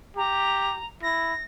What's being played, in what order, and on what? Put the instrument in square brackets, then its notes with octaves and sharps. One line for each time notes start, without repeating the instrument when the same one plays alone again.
[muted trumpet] G4 [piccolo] A#5
[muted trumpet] E4 [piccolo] A#6